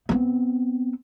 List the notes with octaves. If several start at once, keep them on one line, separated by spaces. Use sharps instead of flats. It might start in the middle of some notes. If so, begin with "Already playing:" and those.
B3 C4